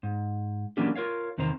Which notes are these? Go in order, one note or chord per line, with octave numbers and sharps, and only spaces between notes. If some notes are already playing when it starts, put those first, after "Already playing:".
G#2
E3 F#3 A#3 C#4 D4 G4
F4 A#4 C#5 F5
E2 C3 D#3 C5 A#5